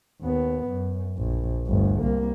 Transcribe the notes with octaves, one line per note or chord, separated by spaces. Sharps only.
D#2 B3
F#2
A#1
G1 D2
C2 A#3